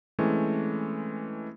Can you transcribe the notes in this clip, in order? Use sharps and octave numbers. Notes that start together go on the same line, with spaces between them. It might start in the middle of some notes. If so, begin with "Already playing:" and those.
E3 G#3 A3 C4 C#4